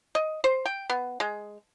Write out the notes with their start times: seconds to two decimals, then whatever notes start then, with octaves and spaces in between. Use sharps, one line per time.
0.15 D#5
0.44 C5
0.65 G5
0.90 B3
1.20 G#3